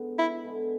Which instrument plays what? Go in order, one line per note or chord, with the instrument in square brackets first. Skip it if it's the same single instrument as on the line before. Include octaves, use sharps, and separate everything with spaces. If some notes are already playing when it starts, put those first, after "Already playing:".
Already playing: [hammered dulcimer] D3 G#3 B3
[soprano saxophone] E4
[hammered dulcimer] D3 G#3 B3